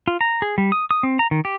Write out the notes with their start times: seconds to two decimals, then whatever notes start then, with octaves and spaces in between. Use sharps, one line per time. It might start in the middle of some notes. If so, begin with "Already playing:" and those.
0.08 F4
0.21 A#5
0.42 G#4
0.58 G3
0.72 D#6
0.91 D#6
1.03 C4
1.19 A#5
1.31 D#3
1.45 G4